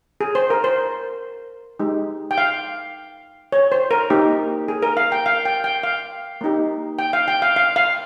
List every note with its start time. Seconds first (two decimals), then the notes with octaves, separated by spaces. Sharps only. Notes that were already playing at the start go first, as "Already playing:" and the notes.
0.21 G#4
0.35 C5
0.50 A#4
0.64 C5
1.79 G#3 D#4 G4
2.31 G5
2.38 F5
3.52 C#5
3.72 C5
3.91 A#4
4.10 A#3 D#4 G4
4.68 G#4
4.82 A#4
4.97 F5
5.12 G5
5.26 F5
5.45 G5
5.64 G5
5.83 F5
6.41 A#3 D#4 G4
6.99 G5
7.13 F5
7.28 G5
7.42 F5
7.56 F5
7.76 F5